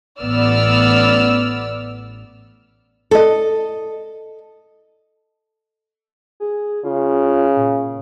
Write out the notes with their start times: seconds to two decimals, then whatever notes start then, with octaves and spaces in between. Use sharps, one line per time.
0.20 A1 B3 D5 E6 F6
3.11 A4 D#5
6.40 G#4
6.84 C#3 F4
7.57 A#2